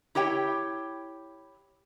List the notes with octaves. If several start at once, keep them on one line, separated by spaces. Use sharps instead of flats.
E4 G4 C#5 G5